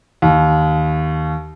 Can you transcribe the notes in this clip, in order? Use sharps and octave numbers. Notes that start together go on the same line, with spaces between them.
D#2